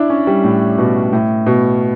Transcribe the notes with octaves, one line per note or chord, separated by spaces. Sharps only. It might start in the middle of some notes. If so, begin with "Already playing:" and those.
Already playing: D4 E4
C#4
G3
A2
B2
A2
B2